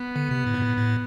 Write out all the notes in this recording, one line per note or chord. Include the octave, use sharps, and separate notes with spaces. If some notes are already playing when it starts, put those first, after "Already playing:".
Already playing: B3
D3
C3
A2
G#2
A2
A2